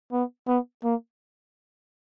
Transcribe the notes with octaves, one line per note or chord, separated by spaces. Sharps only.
B3
B3
A#3